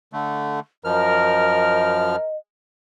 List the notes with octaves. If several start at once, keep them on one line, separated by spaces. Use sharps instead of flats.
D3 A3
F#2 F3 A#4 D#5 F6